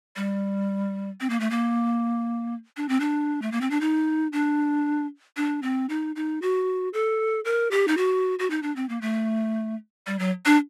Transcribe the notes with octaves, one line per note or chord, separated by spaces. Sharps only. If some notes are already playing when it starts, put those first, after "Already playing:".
G3
C4
A#3
A3
A#3
D4
C4
D4
A3
A#3
C4
D4
D#4
D4
D4
C4
D#4
D#4
F#4
A4
A#4
G4
D#4
F#4
F#4
D#4
D4
C4
A#3
A3
G3
F#3
D4